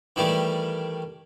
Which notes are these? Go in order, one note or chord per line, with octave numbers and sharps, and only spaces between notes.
D#3 E3 G3 A3